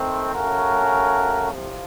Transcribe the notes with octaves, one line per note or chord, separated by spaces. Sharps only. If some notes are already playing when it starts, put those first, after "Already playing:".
Already playing: D#3 A3 C4
C#3 A3 C#4 F#4 A#4
C2 C3 F3